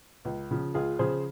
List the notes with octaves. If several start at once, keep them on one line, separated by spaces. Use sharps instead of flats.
C#2
C#3 F3
C#2 F4 G#4
C#3 F3 G#4 C5